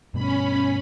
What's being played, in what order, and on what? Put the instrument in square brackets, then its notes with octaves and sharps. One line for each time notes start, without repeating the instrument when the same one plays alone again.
[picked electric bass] G2 B2 [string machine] C#4 B5